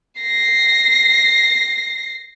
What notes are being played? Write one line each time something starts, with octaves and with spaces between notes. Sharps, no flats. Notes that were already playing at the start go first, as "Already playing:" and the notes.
A#6 C7